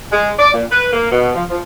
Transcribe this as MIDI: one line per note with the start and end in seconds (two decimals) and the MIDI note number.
0.11 0.31 56
0.38 0.52 74
0.53 0.63 46
0.70 0.89 71
0.93 1.08 58
1.11 1.34 47
1.35 1.44 53
1.50 1.59 53